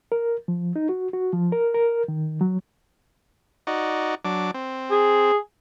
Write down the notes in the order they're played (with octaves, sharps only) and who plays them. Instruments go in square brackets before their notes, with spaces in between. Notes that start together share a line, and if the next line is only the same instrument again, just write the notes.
[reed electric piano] A#4
F3
D#4
F#4
F#4
F3
A#4
A#4
D#3
F#3
[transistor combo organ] D#4 F#4 D5
F#3 D4 D6
C4
[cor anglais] G#4